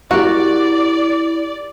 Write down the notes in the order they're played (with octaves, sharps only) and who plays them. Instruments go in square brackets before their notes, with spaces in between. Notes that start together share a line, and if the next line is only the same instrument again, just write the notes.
[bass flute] E4 [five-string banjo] F#4 [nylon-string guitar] G4 A#4 [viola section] D5